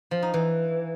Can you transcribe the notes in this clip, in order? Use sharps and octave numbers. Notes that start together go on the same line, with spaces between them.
F3
D#4
E3